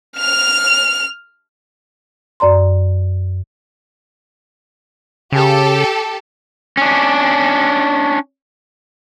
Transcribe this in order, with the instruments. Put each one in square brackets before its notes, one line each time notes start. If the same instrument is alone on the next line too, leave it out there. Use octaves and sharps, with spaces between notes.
[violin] F6 F7
[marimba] F#2 D5 A#5 C6
[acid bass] C#3 [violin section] G4 A4
[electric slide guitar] C#4 D4